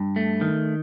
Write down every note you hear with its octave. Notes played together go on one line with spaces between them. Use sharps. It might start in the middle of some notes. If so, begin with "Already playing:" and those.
Already playing: G2
A3
D#3